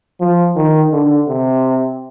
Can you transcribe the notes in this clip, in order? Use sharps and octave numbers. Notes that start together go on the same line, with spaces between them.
F3
D#3
D3
C3